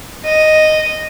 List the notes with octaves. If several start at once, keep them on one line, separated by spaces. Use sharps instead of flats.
D#5